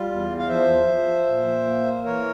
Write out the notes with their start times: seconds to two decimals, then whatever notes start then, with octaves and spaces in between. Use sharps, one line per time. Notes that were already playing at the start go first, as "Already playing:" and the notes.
Already playing: G3 F4
0.10 E2
0.39 F5
0.48 F3 C5 E5
0.87 F3
1.26 A#2
1.65 A#3
2.04 E3 A#4 C#5